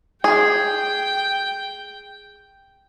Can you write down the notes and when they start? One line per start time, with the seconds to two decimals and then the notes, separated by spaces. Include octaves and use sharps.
0.24 G#4 G5